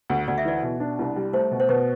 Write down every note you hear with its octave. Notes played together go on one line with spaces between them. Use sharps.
D2
D2 D5
E5
E3 D5
B2
D4
C2
G3
A3 C5
B2
C5
B2 B4